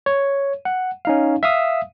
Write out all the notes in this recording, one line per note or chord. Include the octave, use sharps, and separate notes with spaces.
C#5
F#5
C#4 D#4 F5
E5 F5 D#6